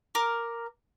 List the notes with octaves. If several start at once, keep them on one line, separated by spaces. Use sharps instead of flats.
A#4 D6